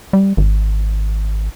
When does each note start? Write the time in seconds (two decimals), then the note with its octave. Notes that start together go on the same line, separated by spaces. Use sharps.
0.13 G3
0.37 G#1